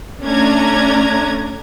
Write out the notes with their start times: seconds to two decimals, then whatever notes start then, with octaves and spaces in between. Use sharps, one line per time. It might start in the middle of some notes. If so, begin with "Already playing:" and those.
0.23 A3 C#4 D4 A#5 G#6